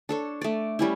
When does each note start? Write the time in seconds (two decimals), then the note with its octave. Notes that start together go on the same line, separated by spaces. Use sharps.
0.09 D4 A4 C#5
0.41 A3 D5
0.79 G3 C#4 E4